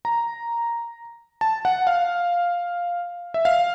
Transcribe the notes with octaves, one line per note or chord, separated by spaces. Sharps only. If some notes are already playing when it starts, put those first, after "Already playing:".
A#5
A5
F#5
F5
E5
F5